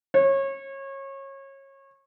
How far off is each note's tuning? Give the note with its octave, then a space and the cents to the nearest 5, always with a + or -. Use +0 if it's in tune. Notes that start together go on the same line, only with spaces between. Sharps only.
C#5 -25